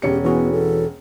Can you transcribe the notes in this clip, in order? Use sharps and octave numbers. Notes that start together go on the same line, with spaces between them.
E1 C#4 G4 C#7
E3 B3 F#4 G#4
A4